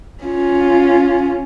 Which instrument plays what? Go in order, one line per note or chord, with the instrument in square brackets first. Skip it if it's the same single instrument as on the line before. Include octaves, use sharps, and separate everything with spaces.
[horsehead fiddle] C#4 F4